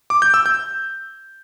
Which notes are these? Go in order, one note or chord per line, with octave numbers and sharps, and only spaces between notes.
D6
G6
E6
G6